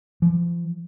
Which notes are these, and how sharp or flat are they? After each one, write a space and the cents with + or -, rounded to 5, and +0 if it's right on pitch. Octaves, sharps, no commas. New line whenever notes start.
F3 -35